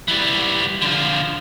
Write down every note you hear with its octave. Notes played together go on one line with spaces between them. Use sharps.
E3 G3
D3 F3